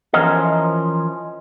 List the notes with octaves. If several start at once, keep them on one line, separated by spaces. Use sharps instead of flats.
E3 F3 C#4 A#4 C5 D#5